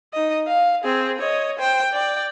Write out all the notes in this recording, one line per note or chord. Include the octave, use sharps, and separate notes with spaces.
D#4 D#5
F5
C4 G#4
C#5 D#5
C5 G5
D5 G5